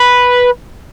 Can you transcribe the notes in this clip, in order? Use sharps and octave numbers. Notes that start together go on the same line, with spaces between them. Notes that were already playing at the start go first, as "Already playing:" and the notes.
Already playing: B4